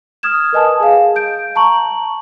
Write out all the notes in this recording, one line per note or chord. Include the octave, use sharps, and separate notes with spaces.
D#6 F6 G#6 E7
A#4 B4 D#5 G#5 A5 D#6
G#4 F5
G6 D7
A5 A#5 C#6 F#7